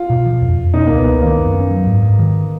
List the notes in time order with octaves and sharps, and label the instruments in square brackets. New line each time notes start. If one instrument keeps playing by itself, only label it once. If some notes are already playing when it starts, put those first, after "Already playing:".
Already playing: [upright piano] F4
[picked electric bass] B2
F3
F2
F2
[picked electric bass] B2 [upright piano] D#4
[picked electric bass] C#2 [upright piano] A#3
[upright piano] B3
[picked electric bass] C#2
[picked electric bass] D#3 [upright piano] A#3
[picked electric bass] F#2
C#4
F#3
G#2
G#2
D#3